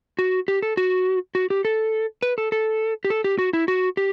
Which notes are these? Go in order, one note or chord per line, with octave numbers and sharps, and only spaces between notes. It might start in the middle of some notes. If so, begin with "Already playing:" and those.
F#4
G4
A4
F#4
F#4
G4
A4
B4
A4
A4
G4
A4
G4
F#4
E4
F#4
G4